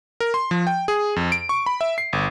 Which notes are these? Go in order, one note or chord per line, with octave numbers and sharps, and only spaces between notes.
A#4
C6
F3
G5
G#4
F2
D7
C#6
B5
E5
C7
G1